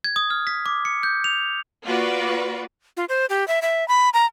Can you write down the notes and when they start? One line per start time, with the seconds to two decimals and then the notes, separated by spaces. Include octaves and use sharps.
0.04 G#6
0.16 D#6
0.30 F6
0.47 B6
0.66 D6
0.85 C#7
1.03 G6
1.24 F7
1.85 A#3 F4 F#4 B4 D5
2.97 F4
3.09 C5
3.30 G4
3.48 E5
3.62 E5
3.88 B5
4.14 A#5